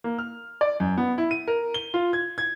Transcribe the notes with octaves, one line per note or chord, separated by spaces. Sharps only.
A#3
F6
D5
F#2
B3
E4
D#7
A#4
G7
F4
G#6
G#6